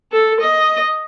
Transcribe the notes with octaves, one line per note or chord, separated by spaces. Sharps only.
A4
D#5